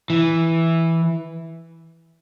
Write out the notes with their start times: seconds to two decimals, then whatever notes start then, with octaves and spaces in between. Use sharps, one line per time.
0.10 E3